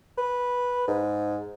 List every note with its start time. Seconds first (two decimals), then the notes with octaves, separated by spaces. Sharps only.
0.18 B4
0.88 G#2